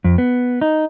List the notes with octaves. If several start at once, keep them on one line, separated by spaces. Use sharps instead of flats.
F2
B3
D#4